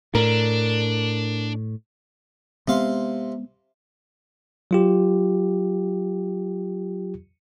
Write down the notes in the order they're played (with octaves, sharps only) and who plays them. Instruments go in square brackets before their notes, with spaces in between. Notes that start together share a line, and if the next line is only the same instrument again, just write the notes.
[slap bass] A2 [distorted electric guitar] D4 [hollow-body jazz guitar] A#4
[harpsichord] C3 F5 C6 [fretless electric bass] G#3 B3 C4
[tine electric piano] F#3 F4 G4